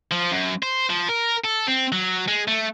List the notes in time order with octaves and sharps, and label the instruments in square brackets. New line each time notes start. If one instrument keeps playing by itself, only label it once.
[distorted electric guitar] F3
F#2
C5
F3
A#4
A4
C4
F#3
G#3
A3